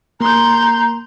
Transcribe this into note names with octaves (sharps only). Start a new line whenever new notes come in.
A#3 A#5 C6 G6